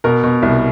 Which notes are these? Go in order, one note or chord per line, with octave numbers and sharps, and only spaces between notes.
B2 A#4
B2
C2